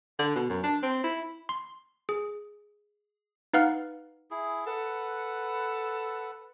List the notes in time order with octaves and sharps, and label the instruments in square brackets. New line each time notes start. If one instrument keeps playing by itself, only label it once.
[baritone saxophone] D3
B2
F#2
D4
C4
E4
[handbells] C6
G#4
D#4 B4 F5 F#5 F6
[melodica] E4 G#4
[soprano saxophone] A4 [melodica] B4 F#5